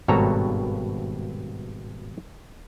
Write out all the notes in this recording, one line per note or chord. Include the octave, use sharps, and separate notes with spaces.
G#1 G2 B2 A4 C#5 A#5